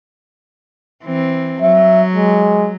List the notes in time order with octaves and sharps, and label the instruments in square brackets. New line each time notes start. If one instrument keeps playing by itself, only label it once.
[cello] E3 C4
[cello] F#3 [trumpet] E5
[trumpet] G#3